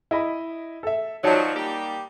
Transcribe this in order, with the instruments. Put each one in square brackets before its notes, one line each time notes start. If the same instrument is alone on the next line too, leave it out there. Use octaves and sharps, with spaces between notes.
[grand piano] E4 D#5 B5
A4 E5
[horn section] F3 F#3 [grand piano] D#4 D5 A5
[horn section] G3 A#3 G4